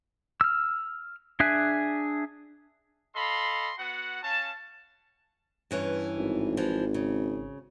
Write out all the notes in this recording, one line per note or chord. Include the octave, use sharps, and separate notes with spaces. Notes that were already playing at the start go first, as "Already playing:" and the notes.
E6 F6
D4 G#4 E5 G#5 F#6
A4 D#5 F5 B5 C6
B3 F#4 F#5
C#4 F5 A5
G2 E3 C#4
G#1
E3 F3
C#3